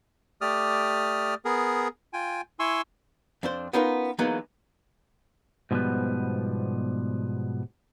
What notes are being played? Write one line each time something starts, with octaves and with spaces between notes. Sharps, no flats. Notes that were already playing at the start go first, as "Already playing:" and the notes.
A3 G4 D5 D#6 F6
B3 G#4 A#4
F4 G5 G#5
E4 G#5 C6 C#6 E6
F2 D4 C5
B3 C#4 D#4 F4 A#4 B4
E3 F#3 G#3 A#3 B3 D#4
G#2 B2 F3 G3 B3 B4